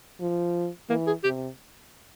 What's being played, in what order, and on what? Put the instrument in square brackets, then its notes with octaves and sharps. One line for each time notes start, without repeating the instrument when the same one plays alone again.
[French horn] F3
[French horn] E3 [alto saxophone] A#3
[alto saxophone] G#4
[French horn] C3 [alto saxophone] G4